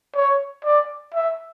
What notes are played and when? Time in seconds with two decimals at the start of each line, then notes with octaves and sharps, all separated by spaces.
0.15 C#5
0.65 D5
1.15 E5